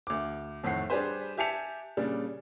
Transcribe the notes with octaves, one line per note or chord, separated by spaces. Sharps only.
D2 D6
F2 A2 D#3 F#5 C7
G3 D4 G4 G#4 B4 C5
G4 E5 G#5 A5 C#7 F7
A#2 C#3 G3 D4